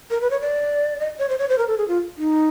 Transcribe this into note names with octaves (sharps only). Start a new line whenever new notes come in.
A#4
B4
C#5
D5
D#5
C#5
C5
C#5
C5
A#4
A4
G#4
F4
D#4